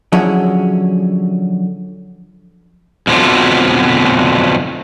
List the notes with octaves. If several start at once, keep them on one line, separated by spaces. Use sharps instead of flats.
D3 F3 F#3 C#4 E4 G#4
F2 B2 D3 F3 F#3 A3